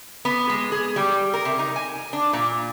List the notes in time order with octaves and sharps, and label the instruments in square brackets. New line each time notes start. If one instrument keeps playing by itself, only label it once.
[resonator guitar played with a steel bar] B3
G#3
G#4
G3
A#4
C3
D#4
G#5
D4
A#2